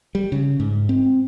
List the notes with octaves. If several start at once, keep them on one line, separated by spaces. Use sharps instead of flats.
G3
C#3
G#2
C4